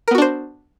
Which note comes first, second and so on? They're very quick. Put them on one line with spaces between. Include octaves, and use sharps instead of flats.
A#4 B3 F#4 D4 C5